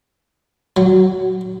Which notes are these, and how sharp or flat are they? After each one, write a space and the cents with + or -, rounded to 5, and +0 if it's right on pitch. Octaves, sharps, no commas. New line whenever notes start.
F#3 +10